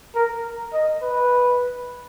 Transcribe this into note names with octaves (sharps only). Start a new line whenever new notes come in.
A#4
D#5
B4